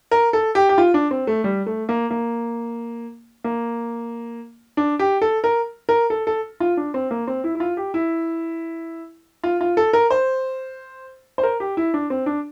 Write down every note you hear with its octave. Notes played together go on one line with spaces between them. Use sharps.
A#4
A4
G4
G4
F4
D4
C4
A3
G3
A3
A#3
A#3
A#3
D4
G4
A4
A#4
A#4
A4
A4
F4
D4
C4
A#3
C4
E4
E4
F4
G4
E4
F4
F4
A4
A#4
C5
C5
A#4
G4
E4
D4
C4
D4